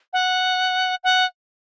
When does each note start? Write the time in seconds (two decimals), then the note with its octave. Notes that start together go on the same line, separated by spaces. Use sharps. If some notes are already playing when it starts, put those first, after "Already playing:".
0.13 F#5
1.04 F#5